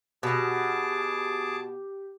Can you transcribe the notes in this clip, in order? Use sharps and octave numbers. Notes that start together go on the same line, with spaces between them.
B2 G4 G#4 A5 D6